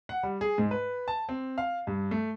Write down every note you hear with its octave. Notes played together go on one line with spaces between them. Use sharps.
F#5
G3
G#4
G#2
B4
A5
C4
F5
G2
A3